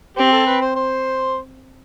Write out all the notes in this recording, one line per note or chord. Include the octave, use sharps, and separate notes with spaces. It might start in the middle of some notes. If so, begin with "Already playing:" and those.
C4 G4
A4
B4
C5
C5